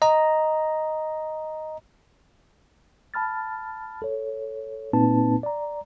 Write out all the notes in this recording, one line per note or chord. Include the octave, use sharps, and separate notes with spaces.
D#5 A#5
A5 B5 F6 A6
A4 C#5
A#2 A#3 C4 D#4 B4 A5
D5 A#5